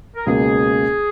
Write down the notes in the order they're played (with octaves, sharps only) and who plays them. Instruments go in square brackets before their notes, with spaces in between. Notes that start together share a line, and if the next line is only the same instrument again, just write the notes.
[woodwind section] A#4
[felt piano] C#2 B2 A#3 C#4 [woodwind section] G#4